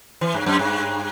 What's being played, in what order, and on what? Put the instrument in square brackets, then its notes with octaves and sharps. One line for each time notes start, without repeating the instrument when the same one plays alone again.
[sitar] E3
G2
F#2
G2